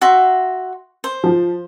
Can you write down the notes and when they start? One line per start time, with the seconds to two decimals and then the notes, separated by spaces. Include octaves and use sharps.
0.02 F#4 E5 C6
1.04 C5
1.24 F3